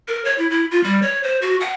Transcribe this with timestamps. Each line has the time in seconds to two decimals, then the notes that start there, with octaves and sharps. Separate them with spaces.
0.08 A#4
0.25 C#5
0.38 E4
0.50 E4
0.71 F4
0.83 G3
1.02 C#5
1.23 C5
1.42 F#4
1.60 F#5